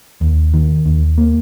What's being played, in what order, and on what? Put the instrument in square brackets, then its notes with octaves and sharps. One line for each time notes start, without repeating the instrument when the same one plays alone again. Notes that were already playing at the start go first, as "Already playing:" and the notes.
[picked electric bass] D#2
D#3
D#2
A#3